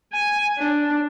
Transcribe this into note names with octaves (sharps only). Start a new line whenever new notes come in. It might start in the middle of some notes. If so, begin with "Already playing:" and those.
G#5
D4